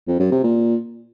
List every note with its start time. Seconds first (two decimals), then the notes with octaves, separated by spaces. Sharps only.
0.07 F2
0.19 F#2
0.31 C3
0.43 A#2